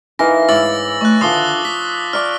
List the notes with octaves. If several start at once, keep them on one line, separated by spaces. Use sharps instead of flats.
E3 D#4 A#4 F5 A#6
G#2 E4 C#5 D6 E6 A6 F#7
A3 D#5 E5 C#6 F#6
D3 D#3 F3 C6 D6 D#6 G7
F4 B6
D5 C#6 D6 F6